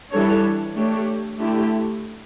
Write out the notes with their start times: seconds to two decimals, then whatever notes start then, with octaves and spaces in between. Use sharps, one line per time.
0.12 E3 G3 D4 A4 C#5
0.75 A3 D4 G4 C#5
1.38 D3 A3 E4 G4